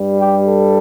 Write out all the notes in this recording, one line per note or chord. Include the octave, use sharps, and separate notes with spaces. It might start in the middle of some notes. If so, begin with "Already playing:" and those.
Already playing: G2 G3
G4
A4